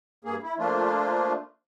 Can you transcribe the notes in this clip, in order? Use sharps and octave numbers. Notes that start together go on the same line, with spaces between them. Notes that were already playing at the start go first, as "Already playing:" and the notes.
G2 A#3 G#4
E4
F3 A3 A#3 D4 F4